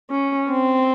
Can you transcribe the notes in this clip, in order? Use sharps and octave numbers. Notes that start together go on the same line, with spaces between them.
C#4
C4